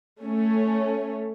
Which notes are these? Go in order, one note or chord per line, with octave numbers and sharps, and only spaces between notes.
A3 C#4